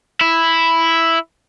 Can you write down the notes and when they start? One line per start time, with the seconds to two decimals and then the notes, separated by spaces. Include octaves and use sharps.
0.21 E4